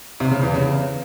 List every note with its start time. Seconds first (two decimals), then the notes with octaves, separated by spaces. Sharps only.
0.20 C3
0.31 C#3
0.43 E2
0.54 C#3